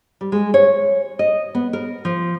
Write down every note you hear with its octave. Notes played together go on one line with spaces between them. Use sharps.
G3
G#3
C#5
D#5
B3
A#4
F3